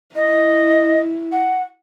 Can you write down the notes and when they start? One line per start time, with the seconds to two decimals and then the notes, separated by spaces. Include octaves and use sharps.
0.15 E4 D#5
1.32 F#5